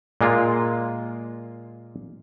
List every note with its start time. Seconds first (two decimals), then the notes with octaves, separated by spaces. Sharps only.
0.21 A#2 G#3 A#3 F4